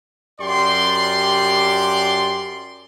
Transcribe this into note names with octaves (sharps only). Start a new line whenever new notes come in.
F#2 G4 D5 C6